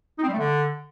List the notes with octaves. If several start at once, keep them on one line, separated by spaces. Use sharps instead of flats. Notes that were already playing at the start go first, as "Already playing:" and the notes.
D#4
C4
G3
A3
D3